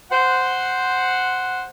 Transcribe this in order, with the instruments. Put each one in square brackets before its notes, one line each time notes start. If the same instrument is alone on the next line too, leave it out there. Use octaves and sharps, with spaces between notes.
[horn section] C5 F#5